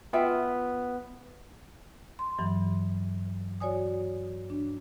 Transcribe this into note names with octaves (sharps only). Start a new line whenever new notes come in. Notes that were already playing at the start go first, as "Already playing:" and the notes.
B3 F4 E5 G5
C6
G2 E3 F#3
F#4 C#5 D5 G#5 D#6
D4